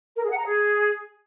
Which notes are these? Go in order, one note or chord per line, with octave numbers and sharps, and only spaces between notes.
A#4
G#4
F#5
A#5
G#4